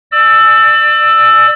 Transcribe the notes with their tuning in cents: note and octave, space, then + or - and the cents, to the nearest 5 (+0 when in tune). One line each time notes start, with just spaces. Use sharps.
D5 +30 E6 +0